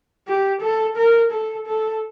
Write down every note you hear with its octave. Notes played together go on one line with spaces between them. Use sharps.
G4
A4
A#4
A4
A4